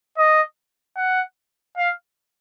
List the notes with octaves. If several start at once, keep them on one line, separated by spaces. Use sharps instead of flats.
D#5
F#5
F5